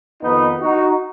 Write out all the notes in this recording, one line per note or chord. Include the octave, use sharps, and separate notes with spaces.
F2 D#3 B3 D#4
D#4 F#4